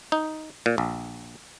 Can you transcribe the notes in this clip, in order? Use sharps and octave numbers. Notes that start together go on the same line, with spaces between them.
D#4
A#2
A#1